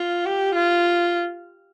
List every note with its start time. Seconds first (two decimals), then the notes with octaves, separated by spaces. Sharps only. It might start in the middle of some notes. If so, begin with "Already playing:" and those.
Already playing: F4
0.25 G4
0.55 F4